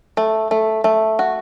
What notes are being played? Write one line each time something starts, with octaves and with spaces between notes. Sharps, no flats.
A3
A3
A3
F#4